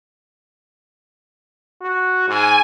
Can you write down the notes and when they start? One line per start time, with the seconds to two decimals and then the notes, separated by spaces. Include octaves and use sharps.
1.82 F#4
2.28 G#2 G#5